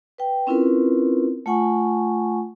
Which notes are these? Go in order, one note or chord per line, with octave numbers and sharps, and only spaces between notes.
B4 G5
C4 C#4 E4 F4 A#4 B4
A3 F4 F#5 G#5 C#6